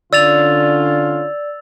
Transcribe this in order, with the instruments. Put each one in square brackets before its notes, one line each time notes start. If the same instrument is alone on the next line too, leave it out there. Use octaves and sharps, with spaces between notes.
[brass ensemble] D3 C#4 F4 [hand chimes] D5 [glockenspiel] E6 A6 F7